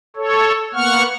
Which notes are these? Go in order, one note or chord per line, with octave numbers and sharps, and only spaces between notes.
A4 C#5
A#3 B3 F#5 C#6 F6